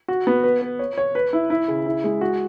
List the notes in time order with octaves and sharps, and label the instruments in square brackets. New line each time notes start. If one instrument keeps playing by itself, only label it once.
[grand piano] F#4
B3
B4
B4
C#5
C#5
B4
E4
E4
C#3
E4
G#3
F#4